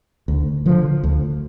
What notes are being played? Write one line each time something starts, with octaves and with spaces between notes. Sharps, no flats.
D2
D3 F3
D2